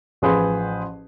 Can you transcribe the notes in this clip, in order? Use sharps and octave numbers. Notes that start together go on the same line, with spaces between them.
A1 F3 G#4 B4 C5